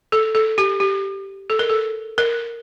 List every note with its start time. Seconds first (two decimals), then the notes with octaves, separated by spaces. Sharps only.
0.12 A4
0.35 A4
0.58 G4
0.80 G4
1.50 A4
1.59 A#4
1.69 A4
2.18 A#4